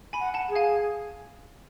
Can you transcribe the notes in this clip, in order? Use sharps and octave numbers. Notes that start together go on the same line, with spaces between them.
G#5 B5
F#5
F#5 A5
G#4
F5 G#5